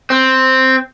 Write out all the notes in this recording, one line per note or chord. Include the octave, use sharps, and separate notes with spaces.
C4